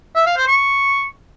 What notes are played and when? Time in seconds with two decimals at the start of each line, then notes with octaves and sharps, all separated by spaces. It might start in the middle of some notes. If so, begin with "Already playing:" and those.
0.16 E5
0.26 F5
0.37 C5
0.48 C#6